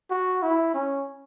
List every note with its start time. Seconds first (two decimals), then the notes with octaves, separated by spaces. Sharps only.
0.11 F#4
0.43 E4
0.74 C#4